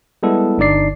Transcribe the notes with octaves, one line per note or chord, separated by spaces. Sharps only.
G3 G#3 B3 E4 A4
G1 D4 D#4 D5 C7